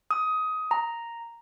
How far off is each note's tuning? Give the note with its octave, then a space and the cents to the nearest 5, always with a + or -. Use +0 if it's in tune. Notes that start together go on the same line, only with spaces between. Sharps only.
D#6 +15
A#5 +0